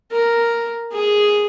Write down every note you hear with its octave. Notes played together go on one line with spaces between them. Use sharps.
A#4
G#4